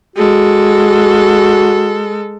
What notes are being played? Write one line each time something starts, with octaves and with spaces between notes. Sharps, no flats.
G#3 F#4 A4